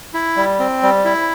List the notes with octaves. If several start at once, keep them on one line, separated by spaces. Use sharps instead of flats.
E4
G3
C4
G3
E4